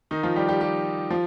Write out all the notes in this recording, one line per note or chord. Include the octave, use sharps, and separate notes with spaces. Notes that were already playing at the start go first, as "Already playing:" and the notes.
D#3 D#4
F3 F4
G3 G4
G3 G4
G3 G4
F3 F4